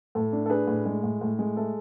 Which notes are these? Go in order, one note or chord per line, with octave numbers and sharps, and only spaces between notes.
A2 A4
D4
A4
D4 G#4 B4
A2
G#3
A2
A2
G#3
A3 A4